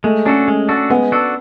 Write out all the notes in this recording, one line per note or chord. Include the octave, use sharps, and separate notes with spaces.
G#3 A3
C#4 D4 F#4 A4
G#3
D4 F#4 A4
G#3 B3
D4 F#4 A4